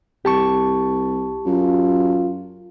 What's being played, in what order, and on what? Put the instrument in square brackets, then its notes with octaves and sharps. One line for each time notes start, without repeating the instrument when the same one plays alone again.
[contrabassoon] C2 [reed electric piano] G4 A5 C#6
[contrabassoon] F#2 [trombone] F4